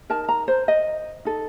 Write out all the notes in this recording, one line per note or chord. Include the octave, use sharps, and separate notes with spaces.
D#4 A#4 A5
A#5
C5
D#5
D#4 A4